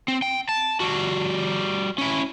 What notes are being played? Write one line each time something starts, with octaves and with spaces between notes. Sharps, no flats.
C4
G5
A5
G3 F#4
C#4 E4